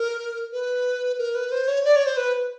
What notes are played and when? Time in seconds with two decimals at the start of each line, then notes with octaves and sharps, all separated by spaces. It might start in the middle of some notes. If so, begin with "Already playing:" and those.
Already playing: A#4
0.53 B4
1.18 A#4
1.35 B4
1.52 C5
1.68 C#5
1.85 D5
1.96 C#5
2.06 C5
2.17 B4